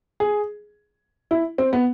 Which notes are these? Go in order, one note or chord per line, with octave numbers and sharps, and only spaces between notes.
G#4
E4
C4
B3